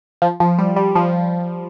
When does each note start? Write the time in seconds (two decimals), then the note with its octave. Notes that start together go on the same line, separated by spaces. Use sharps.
0.22 F3
0.40 F3
0.59 G3
0.76 G3
0.96 F3